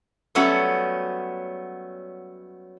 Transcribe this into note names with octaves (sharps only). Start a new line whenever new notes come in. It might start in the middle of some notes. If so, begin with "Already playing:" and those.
F#3 G3 A3 B3 C#4 F#4